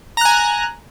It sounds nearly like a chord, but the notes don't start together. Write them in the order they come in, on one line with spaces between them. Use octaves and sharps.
A#5 F#6 G#5